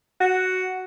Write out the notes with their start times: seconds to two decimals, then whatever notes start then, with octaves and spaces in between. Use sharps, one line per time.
0.21 F#4